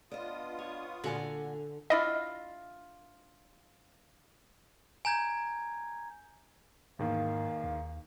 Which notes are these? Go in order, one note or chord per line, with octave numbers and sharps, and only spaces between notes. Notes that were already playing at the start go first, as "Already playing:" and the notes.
B3 D4 F4 D#5 D#6
C#5
A#2 D3 F#4 G#5 D6
D4 E4 F4 D#5
G#5 A#5 G6 G#6
E2 G#2 D#3 A#3 F5
D#2